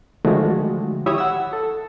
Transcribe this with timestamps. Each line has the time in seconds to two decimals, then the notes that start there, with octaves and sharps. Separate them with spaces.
0.25 D3 D#3 F3 G#3 A3 F#4
1.06 E4 G4 C#5 E5 D#6
1.18 F#5 E6
1.53 A4